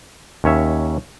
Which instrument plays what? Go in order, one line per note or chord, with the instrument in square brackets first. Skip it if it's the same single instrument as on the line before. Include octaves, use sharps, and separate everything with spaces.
[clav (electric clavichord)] D#2 C#4 C#5 E5